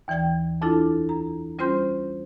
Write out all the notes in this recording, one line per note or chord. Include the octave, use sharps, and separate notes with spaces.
D#2 E3 D5 G5 G#6
F2 D4 E4 F4 A4 D6
A#5
G3 C#4 F4 C5 C6 G6